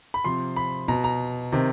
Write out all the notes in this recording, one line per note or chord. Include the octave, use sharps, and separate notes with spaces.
B5
C3 F3 C6
B5
B2 A#5
A#5
C3 D#3